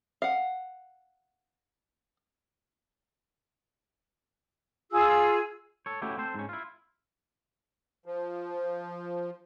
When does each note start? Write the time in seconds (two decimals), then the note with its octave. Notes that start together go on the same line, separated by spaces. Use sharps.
0.22 F5 F#5
4.91 F4 G#4 E6
5.86 A4 C#5
6.02 A3 C#4 E4 F#4 G4
6.17 C4 A4 C5
6.35 G#2 C#4
6.49 E4 F4
8.06 F3